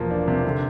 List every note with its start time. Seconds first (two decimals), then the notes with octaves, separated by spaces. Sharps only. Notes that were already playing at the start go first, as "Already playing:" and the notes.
Already playing: E1 F3 A#3
0.11 D4
0.28 C3
0.45 D3